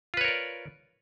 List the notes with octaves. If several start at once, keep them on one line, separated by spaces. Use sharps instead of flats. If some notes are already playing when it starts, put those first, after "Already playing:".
F4 A#4 B4 C#5 D5